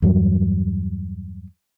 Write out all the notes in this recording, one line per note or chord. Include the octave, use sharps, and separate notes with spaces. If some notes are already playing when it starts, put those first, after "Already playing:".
E2 G2 F#3